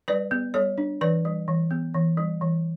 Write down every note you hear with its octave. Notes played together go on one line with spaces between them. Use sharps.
G3 B4 D5
B3
G3 A4 C#5
D4
E3 B4 D5
G3
E3
B3
E3
G3
E3